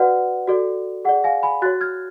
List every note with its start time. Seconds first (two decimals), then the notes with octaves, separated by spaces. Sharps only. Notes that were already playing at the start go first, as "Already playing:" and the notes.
Already playing: F#4 B4 D5 F#5
0.47 F#4 A4 D5
1.05 G#4 F#5
1.09 D5
1.24 F5 G#5
1.43 G#5 B5
1.62 F#4 F#6 A6
1.66 C#5
1.81 F6 G#6